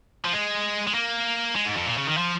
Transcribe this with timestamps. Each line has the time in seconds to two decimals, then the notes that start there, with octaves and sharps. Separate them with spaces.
0.25 F3
0.33 G#3
0.87 G#3
0.94 A#3
1.56 G#3
1.66 G#2
1.77 F2
1.86 A#2
1.97 C#3
2.07 D#3
2.17 F3